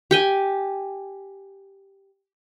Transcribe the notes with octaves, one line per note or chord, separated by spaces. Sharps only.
G4 G5 G#5